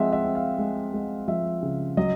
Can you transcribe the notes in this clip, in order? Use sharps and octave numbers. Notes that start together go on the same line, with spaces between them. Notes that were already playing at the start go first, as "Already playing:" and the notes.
Already playing: F3 G#3 C4 E5 F#5
E5
C4
F5
G#3
G#3
F3 E5
C#3
F#3 D#5